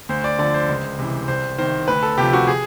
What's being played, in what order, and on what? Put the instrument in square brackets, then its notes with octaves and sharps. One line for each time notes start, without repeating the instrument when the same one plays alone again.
[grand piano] D2 C5
D5
D3 F3 D5
C5
C#2
C3 E3
C2 C5
C3 D#3 C5
D2 B4
A4
C3 F3 G4
F#4
G#4